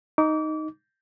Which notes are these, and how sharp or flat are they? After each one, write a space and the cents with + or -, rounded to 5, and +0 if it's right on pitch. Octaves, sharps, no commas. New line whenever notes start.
D#4 +0 D6 -30